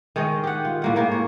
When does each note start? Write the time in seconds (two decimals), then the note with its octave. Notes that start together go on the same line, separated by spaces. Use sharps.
0.16 D#3 G#3 C#5 D#5
0.43 G4 F#5
0.65 F4
0.82 A2 A#3 F#5
0.96 G#2 A#3 G4
1.11 C#5